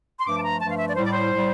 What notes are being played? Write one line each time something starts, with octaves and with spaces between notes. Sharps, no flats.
C6
G2 F3 A3 D6
A5
A#5
G2 F3 A3 A5
F5
E5
D5
A2 G3 C5
D5
C5
A2 G3